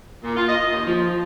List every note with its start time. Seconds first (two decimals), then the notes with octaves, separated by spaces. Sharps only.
0.23 A#2
0.37 F4
0.48 D#5
0.72 D#2
0.86 F3